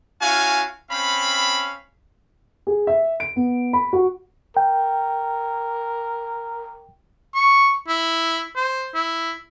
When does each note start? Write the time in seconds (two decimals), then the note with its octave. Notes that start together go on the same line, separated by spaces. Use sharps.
0.21 C#4 E4 F#4 F5 G#5
0.91 C4 C#4 F5 B5
2.67 G#4
2.87 E5
3.20 D7
3.36 B3
3.73 B5
3.93 F#4
4.57 A#4 G5
7.35 C#6
7.88 E4
8.56 C5
8.95 E4